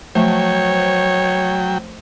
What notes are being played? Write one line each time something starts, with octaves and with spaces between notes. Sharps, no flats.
F3 F#3 A3 C5 C#5 G5